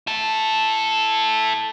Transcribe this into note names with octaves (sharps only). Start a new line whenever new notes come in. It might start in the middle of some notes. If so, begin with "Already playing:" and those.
E4 A4